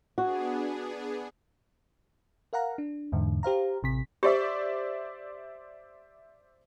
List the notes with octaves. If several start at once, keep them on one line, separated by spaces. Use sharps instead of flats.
B3 D4 F#4 G#4
A#4 F5 F#5 A#5
D4
E2 G#2 D3
G4 C5 F5 A#5
A1 C3 B6
G4 C5 D5 E5